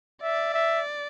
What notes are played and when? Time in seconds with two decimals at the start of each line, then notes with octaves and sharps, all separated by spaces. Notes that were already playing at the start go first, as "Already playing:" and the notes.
0.22 D5 E5
0.54 E5